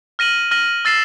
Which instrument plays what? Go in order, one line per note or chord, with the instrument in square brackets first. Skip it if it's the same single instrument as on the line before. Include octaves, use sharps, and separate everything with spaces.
[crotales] F6 A#6 D#7 F#7
F6 A#6 D#7 F#7
E6 A6 C7 E7